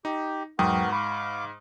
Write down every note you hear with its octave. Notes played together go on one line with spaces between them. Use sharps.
D#4 G4
E2 G#2 F#3 B3 F#4 A#4 G5 D#6
F5 B5 C#6 D6